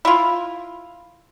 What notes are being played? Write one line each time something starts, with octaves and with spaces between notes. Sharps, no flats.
E4 F4